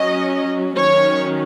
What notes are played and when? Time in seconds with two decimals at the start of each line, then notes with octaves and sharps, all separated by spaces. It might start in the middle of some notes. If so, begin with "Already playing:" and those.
Already playing: F#3 C#4 D#5
0.77 D#3 F#3 C#4 C#5